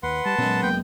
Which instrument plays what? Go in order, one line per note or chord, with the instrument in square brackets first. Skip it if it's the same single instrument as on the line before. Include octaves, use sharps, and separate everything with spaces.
[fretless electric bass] D#2 [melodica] B4 F#5 C6
[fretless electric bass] G3 [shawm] A5
[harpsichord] F#2 G#3 [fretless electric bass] A#2 B3 C#4
[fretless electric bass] F1 A#3 B3 [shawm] G5